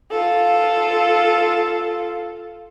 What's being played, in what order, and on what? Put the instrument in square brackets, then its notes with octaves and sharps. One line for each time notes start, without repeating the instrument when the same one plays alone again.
[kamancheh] F4 A4